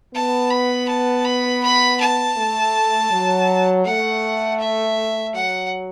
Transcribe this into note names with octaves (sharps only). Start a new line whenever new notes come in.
B3 A5
B5
A5
B5
B5
A5
A3
F#3
A3 F#5
E5
F#3 F#5